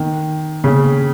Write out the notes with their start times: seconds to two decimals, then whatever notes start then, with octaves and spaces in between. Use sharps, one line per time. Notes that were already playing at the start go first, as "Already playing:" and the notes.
Already playing: D#3
0.64 C#3